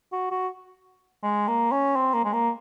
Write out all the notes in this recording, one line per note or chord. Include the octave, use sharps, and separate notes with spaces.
F#4
F#4
G#3
A#3
C#4
C4
A#3
G#3
A#3